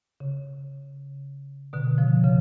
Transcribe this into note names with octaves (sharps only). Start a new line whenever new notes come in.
C#3
B2 D3
C#3 F3
C#3 F3